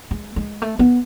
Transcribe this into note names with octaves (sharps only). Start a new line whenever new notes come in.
G#3
G#3
A3
B3